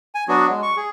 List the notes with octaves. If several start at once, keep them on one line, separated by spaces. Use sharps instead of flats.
G#5
F#3 B3 D4 F#4
G#3
C#6
G#4